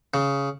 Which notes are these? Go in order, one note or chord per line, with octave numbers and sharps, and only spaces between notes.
C#3